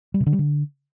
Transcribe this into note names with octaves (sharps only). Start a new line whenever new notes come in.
G3
C3
D3
G3
D3